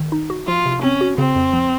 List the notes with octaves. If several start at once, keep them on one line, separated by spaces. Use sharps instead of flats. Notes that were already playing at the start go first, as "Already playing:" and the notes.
Already playing: D#3
D#4
F#4
F3 F4
C3
C4 C#4
F#4
C#3 C4
F2
F3